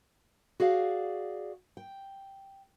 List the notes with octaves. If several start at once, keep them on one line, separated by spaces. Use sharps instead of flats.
F#4 G#4 D5 F5
G5